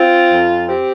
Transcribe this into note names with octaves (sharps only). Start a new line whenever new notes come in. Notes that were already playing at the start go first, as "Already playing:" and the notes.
Already playing: C4 F4
F2
C4 G4